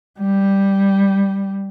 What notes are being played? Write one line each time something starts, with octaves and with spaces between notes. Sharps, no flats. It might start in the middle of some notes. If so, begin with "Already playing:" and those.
G3